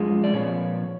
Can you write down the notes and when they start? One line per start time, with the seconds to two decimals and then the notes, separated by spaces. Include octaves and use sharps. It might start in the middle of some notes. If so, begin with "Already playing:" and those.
Already playing: F#2 F3 G#3
0.24 D5
0.33 A#2 F3 C#5